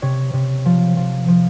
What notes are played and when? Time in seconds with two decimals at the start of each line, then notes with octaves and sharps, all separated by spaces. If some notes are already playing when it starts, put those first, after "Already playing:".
0.02 C3 C#5
0.33 C3
0.66 F3
0.97 F3
1.28 F3